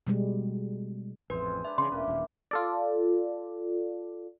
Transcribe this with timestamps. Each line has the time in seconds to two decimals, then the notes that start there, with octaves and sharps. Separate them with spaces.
0.07 B2 G3 G#3
1.30 A1 F2 G#2 B4 C5 G#5
1.65 D4 B4 E5
1.78 C#3 C6
1.92 E1 E3 A#3 C#4 G4
2.08 D#1
2.51 F4 A4 D5